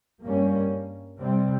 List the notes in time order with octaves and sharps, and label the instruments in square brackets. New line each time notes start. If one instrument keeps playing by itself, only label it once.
[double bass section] G2 G3 A#3 C#4
C3 G3 C4